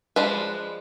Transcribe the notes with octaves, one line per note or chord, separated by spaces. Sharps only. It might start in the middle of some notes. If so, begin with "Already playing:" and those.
F3 G#3 D4 B4